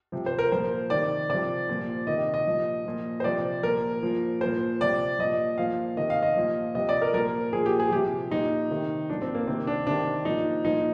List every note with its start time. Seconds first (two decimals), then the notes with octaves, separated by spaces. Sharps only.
0.12 C3 F3
0.26 C5
0.39 A#4
0.52 A#2 F3 C5
0.90 C3 D#3 D5
1.30 C3 F3 D5
1.69 A#2 F3
2.07 D#3 D#5
2.12 C3
2.34 D#5
2.47 A#2 F3
2.85 A#2 F3
3.20 C5
3.24 C3 F3 D5
3.63 A#2 F3 A#4
4.02 A#2 F3
4.41 A#2 F3 C5
4.81 C3 F3 D5
5.19 A#2 F3 D#5
5.58 A#2 F3 F5
5.97 C3 D#3 D#5
6.10 F5
6.23 D#5
6.37 A#2 F3
6.75 C3 F3 D#5
6.89 D5
7.02 A#4
7.14 A#2 F3 A#4
7.53 A#2 F3 G#4
7.66 G4
7.80 G#4
7.92 C3 F3 G4
8.30 A#2 F3 D#4
8.71 C3 D#3
9.09 A#2 F3 D4
9.22 C4
9.34 A#3
9.48 C3 D#3 C4
9.67 D4
9.87 C3 D#3 D4
10.25 A#2 F3 D#4
10.64 A#2 F3 D#4